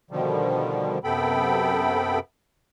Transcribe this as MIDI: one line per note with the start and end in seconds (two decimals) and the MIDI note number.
0.11 0.98 47
0.11 0.98 50
0.11 0.98 51
0.11 0.98 53
0.11 0.98 55
1.04 2.19 42
1.04 2.19 48
1.04 2.19 59
1.04 2.19 69
1.04 2.19 79
1.04 2.19 83